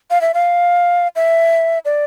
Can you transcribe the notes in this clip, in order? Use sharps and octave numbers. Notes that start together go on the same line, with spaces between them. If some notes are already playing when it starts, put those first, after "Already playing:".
F5
E5
F5
E5
D5